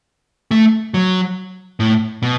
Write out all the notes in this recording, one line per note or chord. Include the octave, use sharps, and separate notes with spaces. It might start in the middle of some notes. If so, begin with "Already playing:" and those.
A3
F#3
A2
B2